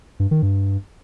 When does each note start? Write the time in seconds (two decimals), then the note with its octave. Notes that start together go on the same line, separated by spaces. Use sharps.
0.20 G2
0.31 D#3
0.42 G2